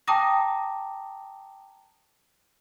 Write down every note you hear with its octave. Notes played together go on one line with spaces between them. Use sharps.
G5 A5 A#5 D6 D#6 A#6